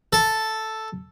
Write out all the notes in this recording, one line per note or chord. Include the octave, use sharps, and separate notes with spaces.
A4